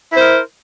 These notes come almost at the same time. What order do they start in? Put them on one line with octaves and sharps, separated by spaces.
E4 C5 A#4